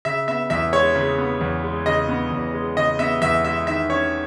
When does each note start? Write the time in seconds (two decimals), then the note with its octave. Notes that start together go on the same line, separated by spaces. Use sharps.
0.05 C#3 E5
0.28 B3 E5
0.50 E2 E5
0.73 G#3 C#5
0.95 C#3
1.18 B3
1.41 E2
1.63 G#3
1.86 C#3 D#5
2.09 B3
2.31 E2
2.54 G#3
2.77 C#3 D#5
2.99 B3 E5
3.22 E2 E5
3.44 G#3 E5
3.67 D#3 E5
3.90 C#4 C#5